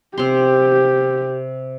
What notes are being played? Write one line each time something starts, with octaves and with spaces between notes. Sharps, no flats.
C3 G4 C6